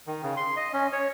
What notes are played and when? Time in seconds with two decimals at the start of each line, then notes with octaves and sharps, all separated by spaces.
0.07 D#3
0.23 C#3
0.37 C6
0.57 D#5
0.73 C#4
0.92 C#5